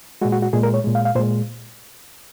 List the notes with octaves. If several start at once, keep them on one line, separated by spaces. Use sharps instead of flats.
A#2 G#3 F#4
F#4
F#4
A#2 G#3 G#4
A#4
C#5
A#2 G#3
F5
F5
A#2 G#3 C5